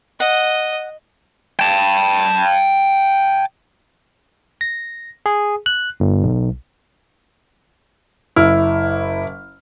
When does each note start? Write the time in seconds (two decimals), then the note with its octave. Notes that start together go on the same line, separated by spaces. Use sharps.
0.20 D#5 F#5
1.59 G5 A5
4.61 A#6
5.26 G#4
5.66 F#6
6.00 G1
6.23 B1
8.36 F#1 E4 F6